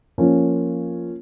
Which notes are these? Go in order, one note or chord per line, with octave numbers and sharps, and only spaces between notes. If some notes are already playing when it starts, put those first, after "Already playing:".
F3 A#3 C#4 F4